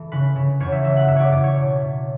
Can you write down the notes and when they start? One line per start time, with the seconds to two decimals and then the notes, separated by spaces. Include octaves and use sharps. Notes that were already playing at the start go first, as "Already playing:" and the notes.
Already playing: E3 A4
0.12 C#3 B4
0.36 C#3
0.60 E2 C#5
0.72 E5
0.84 E3 E5
0.97 F#5
1.08 E2 E5
1.16 C#5 D5
1.32 E2 D5
1.44 C#5
1.56 B2
1.80 B2